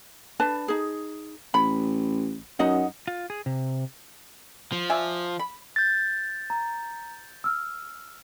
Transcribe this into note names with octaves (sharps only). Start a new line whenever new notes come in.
D4 B4 A5
D#4 G#4
A1 B5
F#2 D#4 D#5 F#5
F4
G#4
C3
F3
D5 E5 G#5
B5
G6 A6
A#5
E6 F6